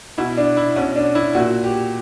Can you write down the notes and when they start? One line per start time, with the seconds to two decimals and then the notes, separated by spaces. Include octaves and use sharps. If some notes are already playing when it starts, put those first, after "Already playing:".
0.18 B2 E4
0.37 D4
0.57 E4
0.76 B2 C#4
0.96 D4
1.15 E4
1.35 A#2 F#4
1.64 G4